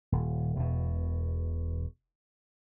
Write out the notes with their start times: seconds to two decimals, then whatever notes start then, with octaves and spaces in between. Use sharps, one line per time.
0.12 D#1
0.56 E1 B2